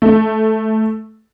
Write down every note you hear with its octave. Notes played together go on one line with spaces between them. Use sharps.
A3